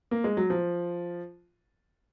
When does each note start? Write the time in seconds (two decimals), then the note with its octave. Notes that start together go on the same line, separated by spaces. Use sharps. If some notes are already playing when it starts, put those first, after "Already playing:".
0.11 A#3
0.24 G#3
0.37 F#3
0.50 F3